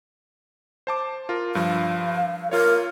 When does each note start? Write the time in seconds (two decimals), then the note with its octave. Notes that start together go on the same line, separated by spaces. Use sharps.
0.87 C5 A5 D6
1.29 F4 A#4
1.55 G2 F3 F5
2.51 F4 A#4 C#5